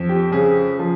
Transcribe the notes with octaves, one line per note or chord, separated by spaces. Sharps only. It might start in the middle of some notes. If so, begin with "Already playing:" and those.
Already playing: F2
G4
C#3 G#4
F3